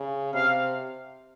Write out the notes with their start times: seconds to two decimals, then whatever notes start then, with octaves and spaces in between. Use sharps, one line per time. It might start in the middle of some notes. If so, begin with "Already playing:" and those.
Already playing: C#3
0.34 C3 F5